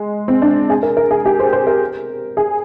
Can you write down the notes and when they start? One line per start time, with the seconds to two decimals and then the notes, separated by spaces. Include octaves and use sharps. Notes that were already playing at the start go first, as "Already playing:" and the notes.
Already playing: G#3
0.28 C4
0.42 D4
0.70 G#4
0.83 A#4
0.97 A#4
1.11 G#4
1.26 G4
1.39 C5
1.53 C5
1.67 A#4
2.37 G#4